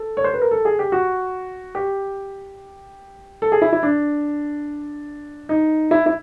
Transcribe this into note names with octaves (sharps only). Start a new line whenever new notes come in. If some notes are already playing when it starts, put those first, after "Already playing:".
Already playing: A4
C#5
C5
B4
A#4
A4
G#4
G4
F#4
G4
A4
G#4
E4
E4
D4
D#4
E4
E4